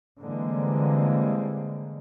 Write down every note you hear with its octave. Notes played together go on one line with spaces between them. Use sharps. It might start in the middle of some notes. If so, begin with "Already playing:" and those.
D3 E3 G3 G#3 A#3 C4